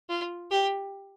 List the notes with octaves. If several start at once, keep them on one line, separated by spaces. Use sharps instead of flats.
F4
G4